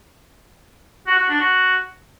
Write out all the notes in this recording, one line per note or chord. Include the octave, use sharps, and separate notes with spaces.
F#4
F#4
D4
F#4